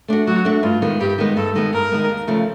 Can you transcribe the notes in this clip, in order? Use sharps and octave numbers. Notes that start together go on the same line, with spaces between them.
A3 D4 F#4
F#3 F#4
A3 D4 F#4
G2 F4
D#3 G#3 B3
G2 G4
D#3 G#3 B3
G2 A4
D#3 G#3 B3
G2 A#4
D#3 G#3 B3
D#2
C#3 F3 A3